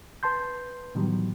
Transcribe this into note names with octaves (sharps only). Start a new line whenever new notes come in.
B4 A5 C6 G6
A2 D#3 E3 F#3 G3 B3